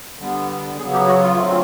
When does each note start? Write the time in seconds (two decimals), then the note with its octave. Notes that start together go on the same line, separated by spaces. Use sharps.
0.19 D3 G3 B3
0.77 C#3 F#3 B3 G#4
0.92 G4
1.06 F#4
1.21 F4
1.36 D3 F#3 A3 C4